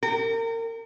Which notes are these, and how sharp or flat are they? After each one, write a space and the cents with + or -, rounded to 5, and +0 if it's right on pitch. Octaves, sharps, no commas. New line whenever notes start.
A#4 -35 G5 +0